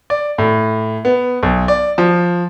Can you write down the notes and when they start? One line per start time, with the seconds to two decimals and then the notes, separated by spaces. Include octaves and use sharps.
0.10 D5
0.38 A2
1.05 B3
1.43 B1
1.68 D5
1.98 F3